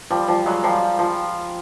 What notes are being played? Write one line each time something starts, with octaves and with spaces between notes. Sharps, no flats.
F3 G3
F3 G3
F#3 G#3
F3 G3
F3